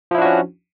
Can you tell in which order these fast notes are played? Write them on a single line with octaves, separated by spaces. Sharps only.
F3 E4 D4 F#4 C#4